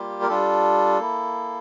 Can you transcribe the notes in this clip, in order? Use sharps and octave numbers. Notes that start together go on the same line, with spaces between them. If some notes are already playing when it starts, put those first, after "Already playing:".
Already playing: G3 A#3 F4 G4
A#4
G3 D4 F4 A4
A#3 E4